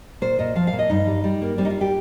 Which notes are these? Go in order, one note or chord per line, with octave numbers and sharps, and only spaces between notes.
A#2 C5
A#2 D#5
F3 F5
F5
A#2
D#5
G2 D#4
G3
G3
A#3
G3 C4
D#4
F4
G4